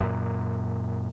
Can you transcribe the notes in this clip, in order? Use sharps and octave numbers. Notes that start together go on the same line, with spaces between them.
F#2 A#2